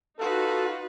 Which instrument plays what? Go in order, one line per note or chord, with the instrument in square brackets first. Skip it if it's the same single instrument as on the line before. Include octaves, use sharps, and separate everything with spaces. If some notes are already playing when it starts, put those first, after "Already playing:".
[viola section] D#4 F#4 [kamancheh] F4 B4 [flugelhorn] A4